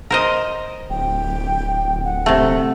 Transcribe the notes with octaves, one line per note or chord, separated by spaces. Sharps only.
A#4 C5 D#5
D1 G5
F#5
C3 A3